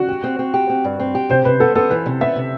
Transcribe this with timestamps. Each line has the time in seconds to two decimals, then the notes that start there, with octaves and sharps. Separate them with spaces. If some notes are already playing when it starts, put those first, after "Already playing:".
Already playing: F#4
0.08 G4
0.24 C4
0.39 C4
0.54 G4
0.70 C4
0.84 G2
1.00 C4
1.15 G4
1.30 C3 C5
1.45 C3 B4
1.60 B3 A4
1.75 B3 A4
1.90 E3 B4
2.06 C3
2.21 B3 E5
2.36 C3